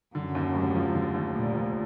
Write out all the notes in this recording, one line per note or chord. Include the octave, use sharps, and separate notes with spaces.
F#2 D3
D#2
F1
F3
D3
D#2
F1 A#2
F3